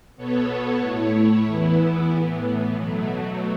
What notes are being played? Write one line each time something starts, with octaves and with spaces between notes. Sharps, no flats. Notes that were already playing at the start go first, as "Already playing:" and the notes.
B2 B3 A4 C#5
A2 A3 E4 C#5
E2 E3 B3 E4
A2 E3 B3
B2 F#3 A3